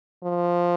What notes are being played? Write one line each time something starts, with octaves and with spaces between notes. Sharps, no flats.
F3